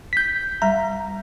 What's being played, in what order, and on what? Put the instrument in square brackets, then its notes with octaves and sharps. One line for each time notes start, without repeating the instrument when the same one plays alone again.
[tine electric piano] G6 B6
[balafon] G3 E5 [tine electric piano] A#5